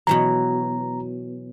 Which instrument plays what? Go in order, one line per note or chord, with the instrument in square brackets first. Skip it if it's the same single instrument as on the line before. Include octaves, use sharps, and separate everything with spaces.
[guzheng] B2 E3 F#3 [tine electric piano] A#5